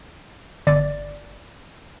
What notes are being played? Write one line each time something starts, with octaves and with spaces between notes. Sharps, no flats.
G1 D5 A6